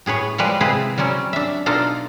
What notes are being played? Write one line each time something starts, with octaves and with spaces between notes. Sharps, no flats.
A2 G#4 B4 C#5
F3 G3 G#3 B4
C3 E4 G#4 B4 C5
F#3 G3 C4 C#4
D4 E5
B2 D4 D#4 F4 A4